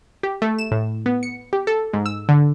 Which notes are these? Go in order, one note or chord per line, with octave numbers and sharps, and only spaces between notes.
G4
A3
E7
A2
B3
C#7
G4
A4
G#2
E6
D3